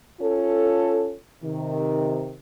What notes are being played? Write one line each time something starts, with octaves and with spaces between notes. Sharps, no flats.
C#4 F4 A4
C3 D#3